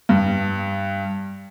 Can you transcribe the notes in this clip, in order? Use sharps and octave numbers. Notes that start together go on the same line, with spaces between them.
G2